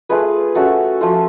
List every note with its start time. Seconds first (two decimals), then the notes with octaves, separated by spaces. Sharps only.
0.09 A3 F4 G#4 B4
0.55 A3 C#4 F#4 A4
1.01 F3 A3 F4